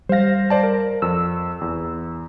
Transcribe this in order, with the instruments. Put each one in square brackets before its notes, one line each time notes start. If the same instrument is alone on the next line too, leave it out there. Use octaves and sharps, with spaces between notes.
[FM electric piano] G3 A#6 [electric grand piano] C5 F5
[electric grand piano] C5 D5 A5
A#4
[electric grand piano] F2 [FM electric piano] E6
[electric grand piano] E2